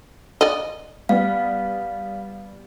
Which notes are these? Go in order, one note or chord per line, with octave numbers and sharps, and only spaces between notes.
D5 D#5
G3 B3 F5